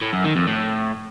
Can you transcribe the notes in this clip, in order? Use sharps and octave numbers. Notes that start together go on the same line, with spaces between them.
A2
F#2
D#3
F2
A2